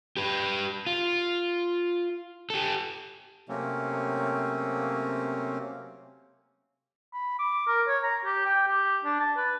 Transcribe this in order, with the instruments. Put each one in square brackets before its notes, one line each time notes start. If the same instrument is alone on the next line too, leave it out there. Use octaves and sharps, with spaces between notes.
[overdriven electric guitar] G4 B4
F4
G4 A4
[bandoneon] C3 F#3 A3 A#3 C4 C#4
[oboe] B5
D6
A#4
C#5
A#5
G4
G5
G4
D4
A5
B4